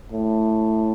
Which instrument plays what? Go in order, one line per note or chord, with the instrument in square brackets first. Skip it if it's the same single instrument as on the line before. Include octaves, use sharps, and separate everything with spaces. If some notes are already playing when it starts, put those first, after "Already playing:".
[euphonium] A2